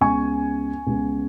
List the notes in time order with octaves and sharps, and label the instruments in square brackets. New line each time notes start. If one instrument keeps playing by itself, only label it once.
[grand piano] C#2 C#3 B3 G#5 C#6
C#2 C#3 B3